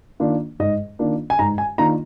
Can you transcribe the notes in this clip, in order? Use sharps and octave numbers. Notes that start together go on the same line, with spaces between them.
D#3 A#3 D4 F4
G#2 D#5
D#3 A#3 D4 F4
G#5
G#2 A#5
G#5
D#3 A#3 D4 F4 A#5